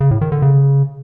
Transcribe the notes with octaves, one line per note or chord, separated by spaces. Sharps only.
C#3
A2
D#3
D3
C#3